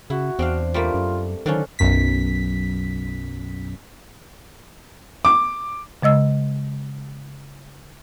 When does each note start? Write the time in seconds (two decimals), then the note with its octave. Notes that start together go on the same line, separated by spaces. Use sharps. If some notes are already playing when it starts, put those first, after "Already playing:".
0.10 C#3 E4 F#4
0.39 E2 C4 D4 F5
0.74 G3 A3 A#3 F4
0.94 F#2
1.46 D3 D#3 F3 F#3 C#4
1.79 B1 F#2 B6
5.25 D6
6.02 C#3 G#3 D#5 E6